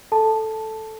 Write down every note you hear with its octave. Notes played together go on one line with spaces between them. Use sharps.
A4 A5